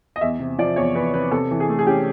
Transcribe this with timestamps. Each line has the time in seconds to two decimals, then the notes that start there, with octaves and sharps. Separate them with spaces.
0.16 D#5
0.21 E2 E5
0.39 C3
0.58 F3 D5
0.76 E2 C#5
0.95 E2 B4
1.14 C3 B4
1.31 C3 A4
1.51 E3
1.60 G#4
1.69 A3
1.79 G#4
1.87 C#4 G4